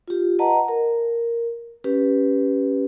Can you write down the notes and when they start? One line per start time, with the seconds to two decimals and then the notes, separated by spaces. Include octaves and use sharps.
0.08 F4 G4
0.39 B4 D#5 F#5 A5 A#5
0.68 A#4
1.84 C#4 G4 B4